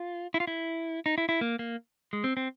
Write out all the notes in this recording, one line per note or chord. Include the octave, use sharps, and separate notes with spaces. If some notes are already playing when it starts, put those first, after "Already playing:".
Already playing: F4
E4
F4
E4
D#4
E4
E4
A#3
A#3
G#3
C4
C4